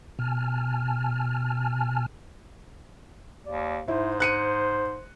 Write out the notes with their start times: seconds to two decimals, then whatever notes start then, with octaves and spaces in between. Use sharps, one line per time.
0.19 B2 G#5 A5 F6
3.46 D#2 D5
3.88 G#2 E4 C5
4.20 C5 F#6 C#7 D#7